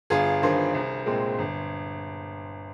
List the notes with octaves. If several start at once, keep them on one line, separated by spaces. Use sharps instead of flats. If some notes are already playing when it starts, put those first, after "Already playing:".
G1 F4 G#4
G2 D#3 G#4 C5
C2
A#2 G#3 C4
G1